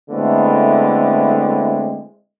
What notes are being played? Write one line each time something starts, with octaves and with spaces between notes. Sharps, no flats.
D3 G#3 A3 B3 C4 E4